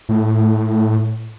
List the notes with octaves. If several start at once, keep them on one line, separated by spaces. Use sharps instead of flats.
A2